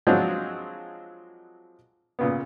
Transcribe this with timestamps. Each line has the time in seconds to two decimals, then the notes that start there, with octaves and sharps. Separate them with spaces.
0.07 F3 F#3 G#3 C4 D4 F#4
2.19 A#2 C#3 B3